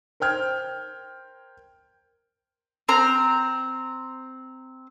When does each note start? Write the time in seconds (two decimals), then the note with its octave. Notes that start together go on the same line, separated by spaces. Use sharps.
0.20 A#4 C5 G5 F6 G#6
2.89 C4 A#5 F6